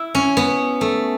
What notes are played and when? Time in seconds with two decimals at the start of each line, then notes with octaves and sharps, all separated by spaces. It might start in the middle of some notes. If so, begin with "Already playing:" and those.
Already playing: E4
0.15 C#4
0.37 B3
0.81 A3